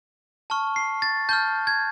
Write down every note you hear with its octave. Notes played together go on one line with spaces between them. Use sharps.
A5 C#6 F6
C7
A6
A5 C#6 F6 G6
G#6